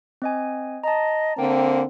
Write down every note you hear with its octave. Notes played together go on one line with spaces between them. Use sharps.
C4 D#5 G#5
D#5 A5 A#5
D3 A#3 C4 G5